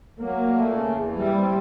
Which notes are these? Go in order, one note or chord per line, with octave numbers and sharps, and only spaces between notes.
F#3 A#3
A#2
A3
C#3
E2
E3
G3 E4
C4